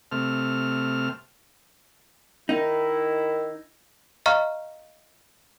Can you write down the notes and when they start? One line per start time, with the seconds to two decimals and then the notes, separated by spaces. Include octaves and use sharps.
0.12 C3 A3 F6
2.49 D#3 D#4 E4
4.26 D#5 F5 A#5 C#6 F6